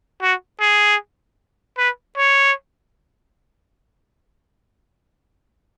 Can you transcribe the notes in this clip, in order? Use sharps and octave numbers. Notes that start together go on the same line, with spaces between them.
F#4
G#4
B4
C#5